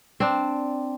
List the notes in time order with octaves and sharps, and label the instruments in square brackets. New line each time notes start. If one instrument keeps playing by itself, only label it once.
[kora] C4 D4